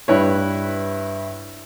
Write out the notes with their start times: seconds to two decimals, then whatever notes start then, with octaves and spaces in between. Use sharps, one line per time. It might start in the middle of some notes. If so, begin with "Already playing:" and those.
0.08 G2 E4 B4 C#5